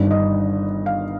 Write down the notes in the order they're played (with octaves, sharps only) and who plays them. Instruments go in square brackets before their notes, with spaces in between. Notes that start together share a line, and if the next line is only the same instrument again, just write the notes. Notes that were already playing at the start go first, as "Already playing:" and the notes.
Already playing: [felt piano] G1 G2 D#3
D#5
F5